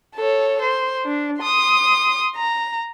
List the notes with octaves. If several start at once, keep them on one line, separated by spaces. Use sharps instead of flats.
A4 C#5
C5
D4
C6 D#6
A#5